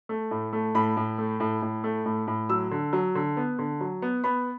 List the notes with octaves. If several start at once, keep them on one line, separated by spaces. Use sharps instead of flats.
A3
A2
A3
A2 B5
A2
A3
A2
A2
A3
A2
A2
F#3 E6
D3
F#3
D3
B3
D3
F#3
B3
B3 B5